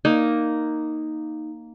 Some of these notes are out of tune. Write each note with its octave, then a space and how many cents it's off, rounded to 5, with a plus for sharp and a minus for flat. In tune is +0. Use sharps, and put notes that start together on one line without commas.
A#3 +0 D#4 +0